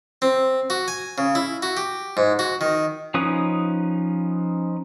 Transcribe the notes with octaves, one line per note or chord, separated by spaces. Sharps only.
C4
F#4
G#5
C#3
E4
F#4
G4
G#2
F#4
D#3
F3 C#4 D#4 B4 D#6